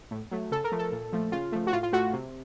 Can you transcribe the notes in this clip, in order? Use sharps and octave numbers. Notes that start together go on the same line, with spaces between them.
A2
F#3 A3
C#3 A4
A#4
F3 A3
A4
A#2
F3 A3
C#3 F4
F3 A3
F#4
A2 F4
F4
A3 F#4
C3